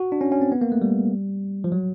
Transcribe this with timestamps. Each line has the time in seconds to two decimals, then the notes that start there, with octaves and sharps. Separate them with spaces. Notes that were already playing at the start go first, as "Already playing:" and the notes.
Already playing: F#4
0.12 D4
0.21 C#4
0.32 C#4
0.41 C4
0.52 B3
0.61 A#3
0.72 A3
0.82 G3
1.64 F3
1.72 F#3